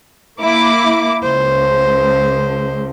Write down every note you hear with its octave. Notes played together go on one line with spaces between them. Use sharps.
A#3 E4 D6
C#2 C5